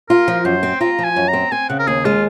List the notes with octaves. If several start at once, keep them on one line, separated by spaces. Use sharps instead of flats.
F4 A#4
F3
F#2 C5
C4
F4 A#5
F3
G#5
F#2
A#5
C4
C4 G#5
C#3 F#5
A#4
D#2 G#4
G#3 F4